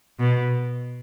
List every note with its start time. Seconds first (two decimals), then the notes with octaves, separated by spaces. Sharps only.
0.19 B2